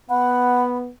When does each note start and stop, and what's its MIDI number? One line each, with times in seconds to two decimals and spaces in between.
0.10 0.90 59
0.10 0.69 78
0.10 0.77 83